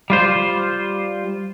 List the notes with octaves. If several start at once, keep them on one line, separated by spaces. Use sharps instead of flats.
G3 F4 C5